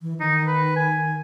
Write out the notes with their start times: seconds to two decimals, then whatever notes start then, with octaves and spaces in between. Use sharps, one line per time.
0.02 E3
0.20 D#3 D#4
0.47 B4
0.76 G#5